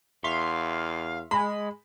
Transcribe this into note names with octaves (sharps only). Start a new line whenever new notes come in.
E2 E5 F5 C6 C#6
G#3 B5